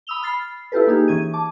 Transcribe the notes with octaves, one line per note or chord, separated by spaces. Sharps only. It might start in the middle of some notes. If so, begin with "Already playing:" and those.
B5 D#6 E6 F7 G7
B5 F6 A6 C7
E4 F4 G4 A4 B4
A#3 D#4 G4 G#4
E3 C#4 G#6 D#7
A5 D6